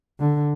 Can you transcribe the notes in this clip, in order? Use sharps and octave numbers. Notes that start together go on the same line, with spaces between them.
D3